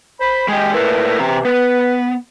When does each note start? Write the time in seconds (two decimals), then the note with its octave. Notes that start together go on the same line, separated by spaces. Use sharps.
0.20 C5 B5
0.48 G#3 G4 D#5 G5
0.74 A#2 A3 E4 A#4 B4
1.20 C3 E3 C4 A#5
1.45 B3 B4